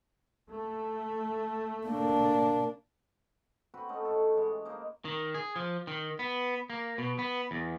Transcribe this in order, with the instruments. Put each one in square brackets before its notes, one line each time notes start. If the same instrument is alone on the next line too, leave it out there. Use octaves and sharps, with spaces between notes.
[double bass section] A3
[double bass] A#3 D4
[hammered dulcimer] C4 F#4 B4
A3 C#4 D#4
A2 A4
E3 G#3
A#3 D#4 C5
[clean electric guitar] D#3
G#4
F3
D#3
B3
A#3
B2
B3
E2